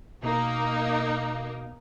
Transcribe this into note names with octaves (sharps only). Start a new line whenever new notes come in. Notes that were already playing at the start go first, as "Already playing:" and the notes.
B2 A#3 D#4